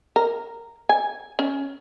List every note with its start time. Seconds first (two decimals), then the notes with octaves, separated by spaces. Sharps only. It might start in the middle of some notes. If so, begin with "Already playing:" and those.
0.16 A#4
0.89 G#5
1.39 C#4